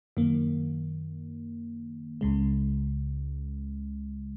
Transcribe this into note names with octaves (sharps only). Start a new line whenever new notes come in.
F#2 D#3 A#3
C#2 C#3 G#3